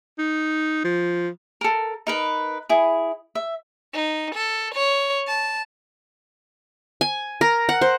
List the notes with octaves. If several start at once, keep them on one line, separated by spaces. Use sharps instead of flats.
D#4
F3
A4 A#4
D#4 A#4 B4
E4 G#4
E5
D#4
A4
C#5
A5
G#5
A#4
F#5
C5